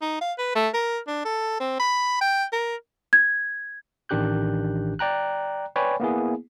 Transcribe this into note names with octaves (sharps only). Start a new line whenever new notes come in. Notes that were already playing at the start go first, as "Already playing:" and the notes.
D#4
F5
B4
A3
A#4
D4
A4
C4
B5
G5
A#4
G#6
A1 D#3 D4 G4 F#6 G6
D5 G5 A#5 F#6
B4 C#5 D5 G5 G#5 B5
A#3 B3 E4 G#4